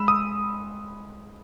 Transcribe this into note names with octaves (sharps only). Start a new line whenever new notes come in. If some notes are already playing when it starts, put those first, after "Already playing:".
Already playing: G#3 B5 E6
D#6